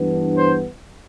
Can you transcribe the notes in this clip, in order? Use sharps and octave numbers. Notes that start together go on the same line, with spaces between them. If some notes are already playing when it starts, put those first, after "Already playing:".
Already playing: G2 E3 B3 D4
C5